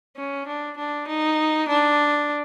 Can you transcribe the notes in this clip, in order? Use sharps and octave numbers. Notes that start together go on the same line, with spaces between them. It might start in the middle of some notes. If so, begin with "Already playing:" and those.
C#4
D4
D4
D#4
D4